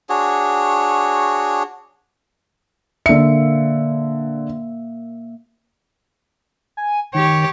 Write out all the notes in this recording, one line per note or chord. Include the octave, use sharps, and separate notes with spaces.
D4 F#4 G#4 C#5
D3 A#3 E5 C#7
G#5
D#3 G4 C#5